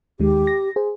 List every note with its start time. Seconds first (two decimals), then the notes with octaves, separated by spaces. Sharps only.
0.20 D#2 D#3 G#3 G4
0.47 A#6
0.76 G#4 C5